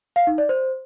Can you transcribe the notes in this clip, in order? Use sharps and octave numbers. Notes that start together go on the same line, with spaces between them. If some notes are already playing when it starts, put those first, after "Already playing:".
F5
D#4
D5
C5